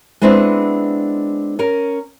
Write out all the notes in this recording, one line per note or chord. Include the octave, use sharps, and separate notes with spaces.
G#3 B3 C4 D4 E4 B4
C#4 A#4